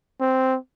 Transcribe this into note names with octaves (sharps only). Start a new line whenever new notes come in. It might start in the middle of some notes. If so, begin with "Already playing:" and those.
C4